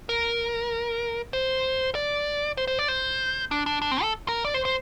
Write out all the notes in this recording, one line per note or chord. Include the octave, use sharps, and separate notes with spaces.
A#4
C5
D5
C5
C5
D5
C5
D4
D4
D4
C4
A4
A#4
D5
C5
C5